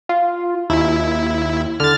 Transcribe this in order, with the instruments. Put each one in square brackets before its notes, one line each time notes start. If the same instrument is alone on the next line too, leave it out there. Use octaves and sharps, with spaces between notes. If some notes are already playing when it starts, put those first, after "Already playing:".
[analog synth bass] F4
[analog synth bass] D#2 [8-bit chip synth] E4
[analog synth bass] D3 [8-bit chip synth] F6 A6